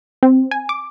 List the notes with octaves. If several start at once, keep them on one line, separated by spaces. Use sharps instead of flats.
C4
G#5
D6